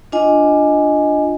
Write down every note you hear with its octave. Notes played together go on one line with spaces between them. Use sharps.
D4 F4 D#5 G#5